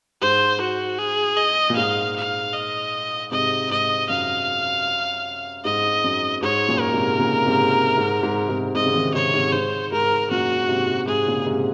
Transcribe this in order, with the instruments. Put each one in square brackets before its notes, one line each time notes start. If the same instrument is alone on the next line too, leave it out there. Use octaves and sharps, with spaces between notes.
[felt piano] G#2 [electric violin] C5
[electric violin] F#4
G#4
D#5
[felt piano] A#2
[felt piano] G#2 [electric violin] F5
[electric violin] F5
D#5
[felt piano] G#2 C3 [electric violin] D#5
[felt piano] G#2 [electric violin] D#5
[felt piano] F#2 [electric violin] F5
[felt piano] G#2 [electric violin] D#5
[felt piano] F#2
[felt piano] G#2 [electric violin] C#5
[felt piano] F#2 A#2
[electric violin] A#4
[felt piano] G#2 C3
A#2 C#3
G#2 C3
G#2
G#2
G#2 C3
[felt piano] G#2 C3 [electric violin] D#5
[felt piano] C#3
C3 D#3
[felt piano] G#2 C3 [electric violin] C#5
[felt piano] G#2 C3
[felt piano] G#2 [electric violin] C5
[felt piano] G#2 [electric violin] A#4
[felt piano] F#2 A#2 [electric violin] F#4
[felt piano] G#2 C3
[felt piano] G#2 C3 [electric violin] G#4
[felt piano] A#2 C#3
G#2 C3